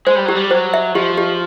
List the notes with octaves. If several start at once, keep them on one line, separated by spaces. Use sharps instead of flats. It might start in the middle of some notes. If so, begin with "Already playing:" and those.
G#3 C5
G3
F#3 G4
G3
F#3 C5
E5
F3 G4
G4